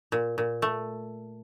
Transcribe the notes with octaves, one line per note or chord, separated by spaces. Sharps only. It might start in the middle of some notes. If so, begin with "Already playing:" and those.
A#2
A#2
A3